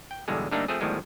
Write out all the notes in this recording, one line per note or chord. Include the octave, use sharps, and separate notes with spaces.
G5
B1 E2 G2 B2 D3 G#3
G2 D3 A3 A#3 D4 D#4
F3 A3 C4 G#4
E2 A2 D#3 F3 G3 G#3